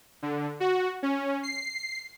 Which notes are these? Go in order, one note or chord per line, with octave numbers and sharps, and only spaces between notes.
D3
F#4
C#4
C7